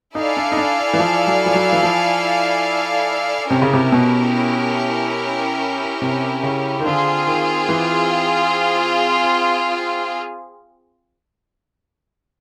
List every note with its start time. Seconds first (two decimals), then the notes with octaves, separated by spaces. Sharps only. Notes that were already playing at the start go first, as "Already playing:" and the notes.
0.15 D#4 E4 A4 D5 F5 G#5
0.37 D4
0.52 D#4
0.57 D4
0.93 E3
0.99 F3
1.27 F#3
1.46 F3
1.55 F#3
1.72 E3
1.83 F3
3.50 C3 C#4 E4 G4 A#4
3.62 C#3
3.73 C3
3.92 B2
6.02 C3
6.43 C#3
6.80 D#3
6.85 D3 C4 F4 G#4
7.27 D#3
7.69 E3